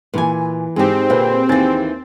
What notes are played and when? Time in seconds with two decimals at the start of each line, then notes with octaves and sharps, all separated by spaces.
0.14 A#2 E3 B4 G#5
0.76 G#2 C4 D#4 G4 G#4
1.10 A#2 D3 B4 C5
1.49 D#2 E3 A#3 G#5 A6